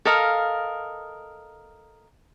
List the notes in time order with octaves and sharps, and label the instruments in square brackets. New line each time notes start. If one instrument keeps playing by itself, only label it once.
[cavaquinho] A4 A#4 D#5 F5